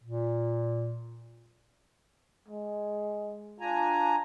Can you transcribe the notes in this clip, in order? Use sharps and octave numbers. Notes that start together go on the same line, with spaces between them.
A#2
G#3
D4 F4 G#5 A#5